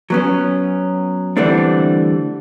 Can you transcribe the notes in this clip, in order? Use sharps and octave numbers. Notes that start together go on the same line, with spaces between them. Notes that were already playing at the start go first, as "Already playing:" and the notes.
F#3 B3 C#4
D3 E3 G3 A3 C4 D4